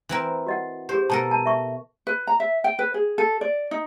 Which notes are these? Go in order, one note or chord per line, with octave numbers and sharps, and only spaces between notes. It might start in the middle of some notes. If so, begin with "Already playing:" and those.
E3 C4 A#4
F#4 D#5 F#5
G4 G#4 C5
B2 A4 A#4 A5
A5
E5 C#6
B4
A#5
E5
G5
B4
G#4
A4
D5
D#4